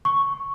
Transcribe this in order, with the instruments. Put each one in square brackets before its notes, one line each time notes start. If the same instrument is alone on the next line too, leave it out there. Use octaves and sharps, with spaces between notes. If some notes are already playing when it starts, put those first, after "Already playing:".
[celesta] C#6